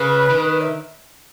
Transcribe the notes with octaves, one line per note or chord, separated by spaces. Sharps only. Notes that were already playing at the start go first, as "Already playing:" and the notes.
Already playing: C#3 B4
D#3
E5